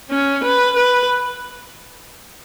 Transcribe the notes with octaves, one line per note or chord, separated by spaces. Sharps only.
C#4
B4
B4